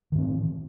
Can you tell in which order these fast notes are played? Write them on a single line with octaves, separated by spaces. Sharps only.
D#3 A2 C4 E3